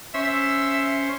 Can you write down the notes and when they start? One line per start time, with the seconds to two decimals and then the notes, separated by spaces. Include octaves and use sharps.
0.14 C#4 C5 E5